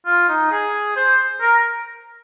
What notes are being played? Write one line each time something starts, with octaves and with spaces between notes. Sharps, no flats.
F4
D#4
G#4
C5
A#4